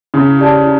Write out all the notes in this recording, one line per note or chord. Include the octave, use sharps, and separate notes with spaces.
C#3 E4
G4 D5 A5
E4